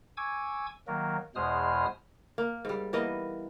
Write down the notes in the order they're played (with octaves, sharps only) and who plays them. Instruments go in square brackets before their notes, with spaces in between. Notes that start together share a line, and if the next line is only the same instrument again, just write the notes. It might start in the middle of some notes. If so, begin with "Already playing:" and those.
[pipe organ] G#5 C#6 D6 E6 G#6
D#3 F#3 A#3 A#4
E2 B2 G#3 C5 D#6 F6
[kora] A#3
G#2 G3
E3 A#3 B3 D#5